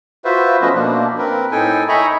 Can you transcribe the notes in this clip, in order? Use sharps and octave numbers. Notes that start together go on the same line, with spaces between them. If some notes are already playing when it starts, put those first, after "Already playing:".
F4 F#4 B4 C5 E5
F3 A3 B3 C#4 B4 D#5
B2 A#3 D4
C4 A#4 B4
A2 D#4 A4 G5 G#5
D#5 E5 G#5 A#5 B5 C#6